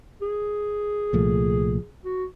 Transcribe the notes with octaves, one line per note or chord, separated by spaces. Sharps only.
G#4
C2 A#2 F3 A3
F#4